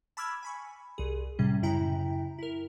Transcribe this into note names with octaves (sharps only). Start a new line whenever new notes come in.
A5 B5 D6 E6 F6 G#6
G#5 B5 C#6
C2 G#4
A2 C3 G3 C#4
F#2 C#3 E4 G5 A#5
E4 A#4